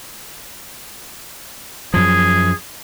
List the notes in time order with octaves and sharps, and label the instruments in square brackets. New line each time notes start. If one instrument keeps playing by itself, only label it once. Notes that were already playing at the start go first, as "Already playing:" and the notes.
[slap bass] F#2 F3 [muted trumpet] G#4